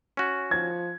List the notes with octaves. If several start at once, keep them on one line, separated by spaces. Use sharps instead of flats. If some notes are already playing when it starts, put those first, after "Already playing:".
C#4 F#4
F3 G#6